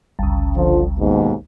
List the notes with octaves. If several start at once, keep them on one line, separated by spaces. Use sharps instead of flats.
G1 C#2
D3 F3
D#2 G#2 B2